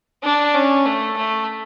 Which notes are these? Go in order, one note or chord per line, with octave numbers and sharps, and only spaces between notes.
D4
C#4
A3
A3